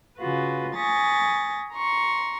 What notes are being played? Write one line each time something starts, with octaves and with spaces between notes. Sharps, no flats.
C#3 F4 F#4 B4
G#5 B5 C#6 D#6 A6 A#6
A#5 C6 C#6